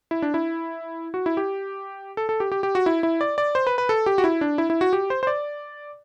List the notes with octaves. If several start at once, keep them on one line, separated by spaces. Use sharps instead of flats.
E4
D4
E4
F#4
E4
G4
A4
A4
G4
G4
G4
F#4
E4
E4
D5
D5
C5
B4
B4
A4
G4
F#4
E4
D4
E4
E4
F#4
G4
C5
C5
D5